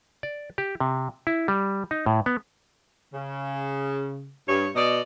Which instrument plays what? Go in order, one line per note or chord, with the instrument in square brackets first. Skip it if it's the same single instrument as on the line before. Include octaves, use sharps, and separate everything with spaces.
[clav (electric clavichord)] D5
G4
C3
E4
G3
D#4
A2
B3
[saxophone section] C#3
G2 C#5
B2 D5 D#5